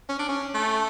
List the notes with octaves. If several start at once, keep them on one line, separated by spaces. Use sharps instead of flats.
C#4
D4
C#4
A3